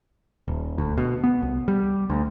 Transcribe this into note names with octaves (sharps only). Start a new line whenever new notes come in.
D#1
D2
B2
B3
C2
G3
D2